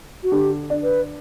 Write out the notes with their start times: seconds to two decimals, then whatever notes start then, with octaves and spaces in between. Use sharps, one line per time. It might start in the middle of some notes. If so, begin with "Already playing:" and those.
0.23 F#4
0.32 D3 G4
0.70 D4
0.83 B4